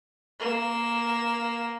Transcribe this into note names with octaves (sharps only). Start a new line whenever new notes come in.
A#3 E7